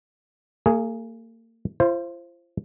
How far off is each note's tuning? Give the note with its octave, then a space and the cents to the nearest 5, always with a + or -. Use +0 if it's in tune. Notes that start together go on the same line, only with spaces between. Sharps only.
A#3 -40 G#4 +0
F4 -40 C5 +10